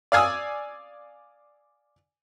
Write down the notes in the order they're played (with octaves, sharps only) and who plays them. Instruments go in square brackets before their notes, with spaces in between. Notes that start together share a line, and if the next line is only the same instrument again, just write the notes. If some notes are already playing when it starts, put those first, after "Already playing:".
[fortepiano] D5 F5 G#5 D#6 E6